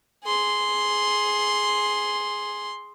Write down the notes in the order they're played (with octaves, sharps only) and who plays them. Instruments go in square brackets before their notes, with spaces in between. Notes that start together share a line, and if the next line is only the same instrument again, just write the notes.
[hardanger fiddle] G#4 C6